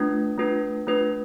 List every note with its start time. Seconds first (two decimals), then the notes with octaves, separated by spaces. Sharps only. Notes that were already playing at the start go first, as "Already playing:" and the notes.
Already playing: A3 D4 F4 B4
0.38 A3 D4 F4 B4
0.87 A3 D4 F4 B4